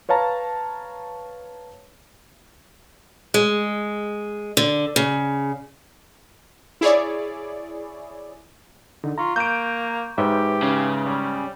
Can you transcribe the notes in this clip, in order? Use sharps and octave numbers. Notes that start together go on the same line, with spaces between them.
B4 C#5 F5 A5 A#5
G#3
D3
C#3
E4 G#4 C#5 D5
D3 D#4
F4 A#5 C#6
A#3 G6 D7
G#2 G4 B4 C#5 E5
C#3
G3